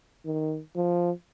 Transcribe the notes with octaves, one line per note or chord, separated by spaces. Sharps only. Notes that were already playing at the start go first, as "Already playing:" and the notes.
D#3
F3